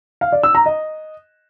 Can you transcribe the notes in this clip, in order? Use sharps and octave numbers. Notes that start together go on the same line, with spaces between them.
F5
D5
E6
A#5
D#5